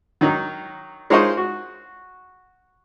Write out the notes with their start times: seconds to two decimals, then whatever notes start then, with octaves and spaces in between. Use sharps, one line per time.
0.21 D#3 F#3 D#4
1.10 G#3 D#4 F4 C5 C#5 D#5
1.37 F#4